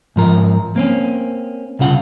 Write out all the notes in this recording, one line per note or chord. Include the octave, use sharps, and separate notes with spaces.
G#2 F3 A#4
A#3 C4 C#4
C2 C#3 F4 F#5